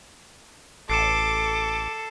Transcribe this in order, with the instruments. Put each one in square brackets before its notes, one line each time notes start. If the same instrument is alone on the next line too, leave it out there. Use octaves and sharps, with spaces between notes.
[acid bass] A1 [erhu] A4 [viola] D6 [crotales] C7 C#7 E7